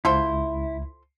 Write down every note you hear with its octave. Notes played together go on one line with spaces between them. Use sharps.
C#2 E4 F4 A4 C5